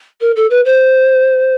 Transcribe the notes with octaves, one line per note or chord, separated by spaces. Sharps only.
A#4
A4
B4
C5